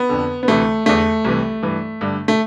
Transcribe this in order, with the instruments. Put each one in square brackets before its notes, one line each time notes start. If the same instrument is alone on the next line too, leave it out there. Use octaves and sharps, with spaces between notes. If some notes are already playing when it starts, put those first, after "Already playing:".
Already playing: [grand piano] B3
F2 D3
B3
D2 C3 E3 A3
E2 D3 A3
C2 C3 E3
G2 E3
G2 D3
A3